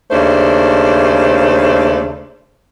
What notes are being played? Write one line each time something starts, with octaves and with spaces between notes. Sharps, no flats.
D#2 C#3 A3 D4 C5